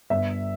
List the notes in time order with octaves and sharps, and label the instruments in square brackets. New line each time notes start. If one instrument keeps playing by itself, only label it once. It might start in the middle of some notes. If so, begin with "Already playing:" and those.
[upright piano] G1 E5